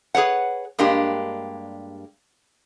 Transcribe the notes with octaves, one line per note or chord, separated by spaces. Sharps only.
G#4 B4 C#5 F#5
G2 G#3 A#3 D4 G4